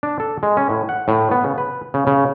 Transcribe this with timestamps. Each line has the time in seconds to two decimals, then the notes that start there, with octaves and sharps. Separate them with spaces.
0.03 D4
0.20 A4
0.43 G#3
0.57 C#4
0.70 A2
0.89 F#5
1.08 A2
1.31 B3
1.44 C#3
1.58 B4
1.94 C#3
2.07 C#3